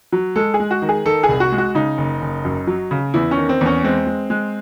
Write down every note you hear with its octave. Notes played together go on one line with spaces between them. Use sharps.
F#3
G#3 A4
G#4
G#3
F#4
D#3
G#4
D#3 A4
G#4
C2
F#4
G#3
F#4
C#3 D#4
F#1
F#1
F#2
F#3
C#3
E2 E4
C#4
D#3
C4
E2 C#4
G#3 C4
G#3
G#3